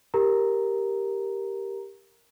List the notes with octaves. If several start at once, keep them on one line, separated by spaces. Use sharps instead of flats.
G4 A#4 A#5